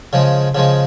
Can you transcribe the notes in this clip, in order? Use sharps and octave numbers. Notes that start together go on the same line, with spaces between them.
C#3 F3 G#3
C#3 F3 G#3